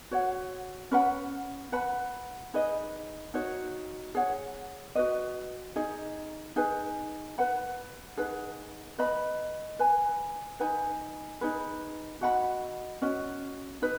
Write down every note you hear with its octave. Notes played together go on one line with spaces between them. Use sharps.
F#4 C#5 F#5
C#4 B4 F#5 B5
B4 F#5 B5
D#4 G#4 B4 D#5
D#4 F#4 C#5
G#4 C#5 F#5
F#4 B4 D#5
D#4 G#4 D#5
D#4 G#4 B4 G#5
B4 F#5 B5
D#4 G#4 B4 F#5
B4 D#5 B5
B4 G#5 B5
D#4 B4 G#5 B5
D#4 G#4 B4
F#4 D#5 F#5 B5
C#4 F#4 D#5
D#4 B4